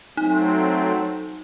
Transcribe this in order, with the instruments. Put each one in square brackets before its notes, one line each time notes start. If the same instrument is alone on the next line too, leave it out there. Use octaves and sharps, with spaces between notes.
[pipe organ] F#3 A3 C4 [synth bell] D#4